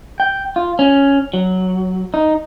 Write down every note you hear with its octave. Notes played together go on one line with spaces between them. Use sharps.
G5
F4
C#4
F#3
D#4